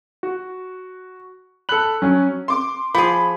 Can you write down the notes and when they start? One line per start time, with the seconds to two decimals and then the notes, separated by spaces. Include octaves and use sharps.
0.23 F#4
1.69 A4 B5 F#6 F#7
2.02 F#3 C#4 G#5
2.48 C6 D6
2.95 F3 G#4 B5